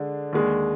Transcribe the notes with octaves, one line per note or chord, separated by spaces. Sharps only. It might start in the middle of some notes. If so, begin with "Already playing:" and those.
Already playing: D3 G#3 D4
D#2 D3 G#3 D4